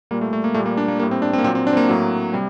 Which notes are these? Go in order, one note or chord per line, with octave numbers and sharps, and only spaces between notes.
A#2 G3 A#3
A3
A3
A#3
A#2 G3 A3
A#3
D4
A#3
A2 G3 A#3
C4
D4
C4
A#3
A#2 F#3 C4
C4
D4
C4
A#3
A2 F#3
C3 G3